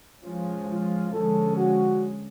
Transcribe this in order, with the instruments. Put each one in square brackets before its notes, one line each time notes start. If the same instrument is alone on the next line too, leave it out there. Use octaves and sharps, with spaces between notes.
[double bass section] F3 G#3 C#4 [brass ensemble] F4
[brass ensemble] F4
[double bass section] D3 F3 G#3 C#4 [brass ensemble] A4
[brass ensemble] F#4